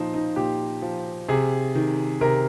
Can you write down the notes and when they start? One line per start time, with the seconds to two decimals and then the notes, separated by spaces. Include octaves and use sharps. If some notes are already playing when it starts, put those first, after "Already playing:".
Already playing: A#2 F3 D#4 C5
0.14 D#4
0.36 A#2 G4
0.82 F3
1.29 C3 G#4
1.75 D#3
2.21 C3 A#4